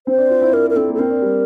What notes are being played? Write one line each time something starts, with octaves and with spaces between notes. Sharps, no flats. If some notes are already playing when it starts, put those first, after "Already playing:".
C4 C5
D4
F4
E4
D4 A#4
A#4
C4 A4
A#3
A4
C4 A#4
D4
G3